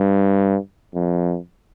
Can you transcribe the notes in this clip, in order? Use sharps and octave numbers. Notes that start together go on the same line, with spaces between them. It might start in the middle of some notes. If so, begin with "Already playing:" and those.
Already playing: G2
F2